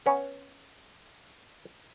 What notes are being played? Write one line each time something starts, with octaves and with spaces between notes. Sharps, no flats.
B3 C#4